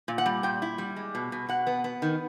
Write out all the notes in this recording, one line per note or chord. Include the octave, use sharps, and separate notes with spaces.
A#2
F#5
G3
A#2 G5
E4
G3
G#3
B2
B2
B2 F#5
B3
B3
D#3